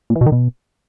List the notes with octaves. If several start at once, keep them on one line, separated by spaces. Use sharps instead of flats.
A#2
E3
B2
D#3
B2